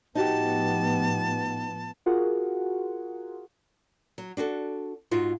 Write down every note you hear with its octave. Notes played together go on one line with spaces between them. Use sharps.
A2 F3 B3 D#4 F#4 G4 A5
F4 F#4 G#4 A#4 F#5
F#3
D4 F#4 G#4 A4
G#2 D#4 F4 F#4